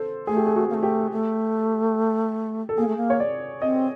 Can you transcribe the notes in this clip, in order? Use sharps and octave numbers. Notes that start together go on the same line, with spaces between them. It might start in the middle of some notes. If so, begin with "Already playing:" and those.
Already playing: A4 C5
A3 G#4
G4
G#4
F#4
A#3
A3
G4
A3
A4
A#3 G#4
A3
A#3
C#5
D5
C4 D#5